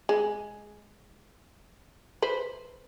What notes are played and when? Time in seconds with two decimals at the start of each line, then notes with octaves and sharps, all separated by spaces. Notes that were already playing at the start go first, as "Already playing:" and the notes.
0.09 G#3
2.22 B4 C5